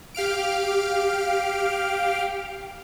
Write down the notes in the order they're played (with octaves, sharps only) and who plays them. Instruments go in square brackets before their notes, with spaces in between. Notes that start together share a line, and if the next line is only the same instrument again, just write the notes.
[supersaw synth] G4 F5 F6 D7